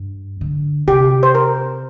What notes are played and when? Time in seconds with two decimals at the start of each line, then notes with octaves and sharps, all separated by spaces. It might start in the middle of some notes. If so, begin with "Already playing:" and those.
Already playing: G2
0.41 D3
0.87 C3 G4
1.23 C5
1.35 A#4